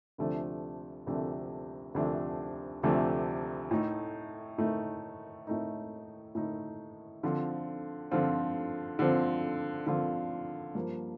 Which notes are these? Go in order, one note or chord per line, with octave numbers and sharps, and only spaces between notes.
D2 C3 F3 A3 D4
D2 C3 F3 A3 D4
D2 C3 F3 A3 D4
D2 C3 F3 A3 D4
A2 A3 D#4
A2 A3 D#4
A2 A3 D#4
A2 A3 D#4
D3 F3 C4 F4
D3 F3 C4 F4
D3 F3 C4 F4
D3 F3 C4 F4
G2 F3 A#3